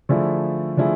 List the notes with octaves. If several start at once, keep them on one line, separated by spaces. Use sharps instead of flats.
D3 F3 A3 E4 G#4
D3 F3 A3 E4 G#4